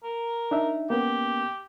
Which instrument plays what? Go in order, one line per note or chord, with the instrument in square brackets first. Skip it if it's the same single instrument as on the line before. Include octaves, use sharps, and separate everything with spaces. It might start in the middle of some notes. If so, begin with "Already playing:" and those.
[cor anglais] A#4
[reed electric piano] D4 D#4 E5
[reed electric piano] A#3 B3 C#4 [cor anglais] G4